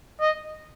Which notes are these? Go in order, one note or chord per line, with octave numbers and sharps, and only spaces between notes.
D#5